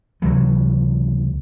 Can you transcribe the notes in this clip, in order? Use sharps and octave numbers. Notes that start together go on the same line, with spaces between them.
C#2 C3 E3 F#3